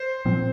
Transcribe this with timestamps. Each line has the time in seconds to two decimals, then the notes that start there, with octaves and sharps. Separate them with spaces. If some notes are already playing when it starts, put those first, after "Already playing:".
Already playing: C5
0.25 A#2 F3 C4